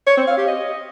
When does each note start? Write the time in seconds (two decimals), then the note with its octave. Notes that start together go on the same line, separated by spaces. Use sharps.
0.07 C#5
0.17 C4
0.27 F5
0.37 G4
0.48 D#5